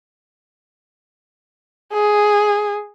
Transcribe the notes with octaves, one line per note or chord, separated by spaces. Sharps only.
G#4